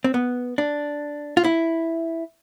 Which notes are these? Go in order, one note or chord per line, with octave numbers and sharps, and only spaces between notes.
C4
B3
D4
F4
E4